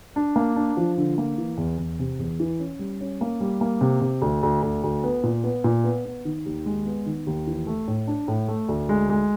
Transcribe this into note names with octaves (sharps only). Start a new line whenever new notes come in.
D4
A#3
D4
F3
D3
A#3
E3
E2
E2
C3
E2
E3
C#4
G3
C#4
A#3
G3
A#3
C3
C3
D2
D2
D2
D2
B3
A#2
B3
A#2
B3
B3
D#3
D#2
G#3
B3
D#3
D#2
E3
A3
A2
D4
A2
A3
D2
G#3
G#3